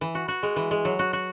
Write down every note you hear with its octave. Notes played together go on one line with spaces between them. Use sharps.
E3
F#4
F#4
G#3
E3
G#3
F#3
F#4
F#4